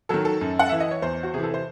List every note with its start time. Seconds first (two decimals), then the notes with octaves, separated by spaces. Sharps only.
0.09 D#3 F#3 A4
0.25 A4
0.41 F#2
0.59 F#5
0.69 E3 E5
0.80 D#5
0.91 C#5
1.02 E2 C5
1.23 F#4
1.33 C3 E3 G#4
1.43 A4
1.54 C5